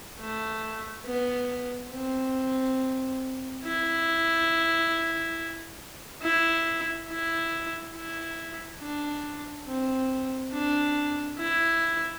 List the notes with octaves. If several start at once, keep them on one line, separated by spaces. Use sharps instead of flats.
A3
B3
C4
E4
E4
E4
E4
D4
C4
D4
E4